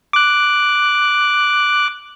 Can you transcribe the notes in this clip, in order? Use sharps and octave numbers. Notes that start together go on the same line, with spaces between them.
D6 F#6